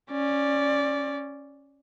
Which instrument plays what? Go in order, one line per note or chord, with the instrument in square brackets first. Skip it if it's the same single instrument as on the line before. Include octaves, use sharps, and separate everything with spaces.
[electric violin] C#4 D5